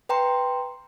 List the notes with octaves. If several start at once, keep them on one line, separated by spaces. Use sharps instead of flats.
B4 G5 A#5 C6